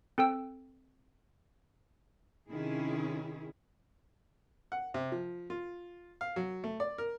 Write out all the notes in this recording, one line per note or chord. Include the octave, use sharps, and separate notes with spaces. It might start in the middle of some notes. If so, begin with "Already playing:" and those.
C4 A4 G5 E6
C3 D#3 C#4 E4 G#4
F#5
C3
F3
F4
F5
F#3
A3
D5
A#4